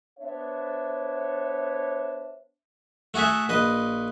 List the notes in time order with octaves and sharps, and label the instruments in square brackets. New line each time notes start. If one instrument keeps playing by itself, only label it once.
[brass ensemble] B3 D4 C5 C#5 E5
[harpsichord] A3 F#4 G#4 A4 E5
A#1 B4 D#5